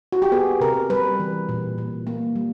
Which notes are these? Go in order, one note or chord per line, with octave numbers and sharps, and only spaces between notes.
F#4
G4
B3 G#4
C3 A#4
G3 B4
E3
A#2
A#2
A#3
G3